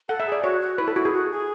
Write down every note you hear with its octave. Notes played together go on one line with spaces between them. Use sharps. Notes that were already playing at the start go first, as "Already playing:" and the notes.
A4 F#5
E5
G#4
D5
F#4 C#5
F#4
E4 B4
A4
E4 F#4
G#4
F#4
G#4